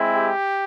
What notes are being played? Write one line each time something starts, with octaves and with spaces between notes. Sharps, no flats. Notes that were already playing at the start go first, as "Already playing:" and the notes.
Already playing: G#3 C4 E4
G4